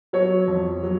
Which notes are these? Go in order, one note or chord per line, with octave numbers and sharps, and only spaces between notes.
F#3 C#5
F2
F#3